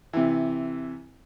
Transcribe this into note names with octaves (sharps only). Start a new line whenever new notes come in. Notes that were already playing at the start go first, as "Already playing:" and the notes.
C3 E3